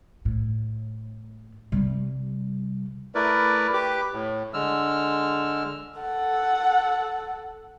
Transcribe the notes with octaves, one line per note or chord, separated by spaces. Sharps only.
A2
C3 G3
A3 E4 A#4 B4 D5
G4 B4 D6
A2
D3 G#3 E6 F6
A4 F#5